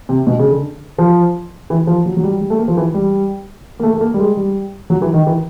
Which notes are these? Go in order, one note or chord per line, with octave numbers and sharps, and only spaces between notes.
C3
B2
C#3
D3
F3
E3
F3
F#3
F#3
G3
G3
A3
A#3
F3
E3
G3
A#3
A3
A3
A#3
G3
G#3
G3
F#3
E3
D#3
E3